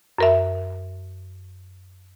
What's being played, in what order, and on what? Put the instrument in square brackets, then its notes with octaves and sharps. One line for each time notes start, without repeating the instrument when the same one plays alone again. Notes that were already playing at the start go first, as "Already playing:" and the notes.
[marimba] F#2 A#4 E5